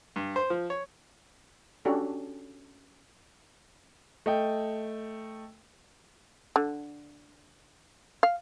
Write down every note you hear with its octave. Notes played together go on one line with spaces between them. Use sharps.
G2
C5
F3
C#5
C#4 D4 F#4 G4 A4
A3 D#5 G5
D3
F5